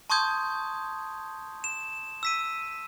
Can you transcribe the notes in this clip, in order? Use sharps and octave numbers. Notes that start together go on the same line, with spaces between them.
A5 C6 C#6 D#6 G6 G#6
E7
E6 B6 D#7